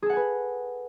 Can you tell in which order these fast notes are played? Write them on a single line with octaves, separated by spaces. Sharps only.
G#4 A4 F#5 G#5 B4